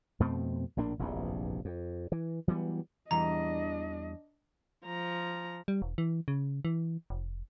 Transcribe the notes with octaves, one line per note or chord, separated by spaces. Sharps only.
F2 B2 A3 C4
A#1 A2 A#3 D4
F1 A#1 E2 G2
F2
E3
E3 F#3 G3 B3
E2 E3 G3 D4 D#5 A#5
F3 A#5
G3
E1
E3
C#3
E3
F1